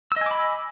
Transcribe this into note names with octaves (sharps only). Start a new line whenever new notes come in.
D#5 G#5 B5 D6 E6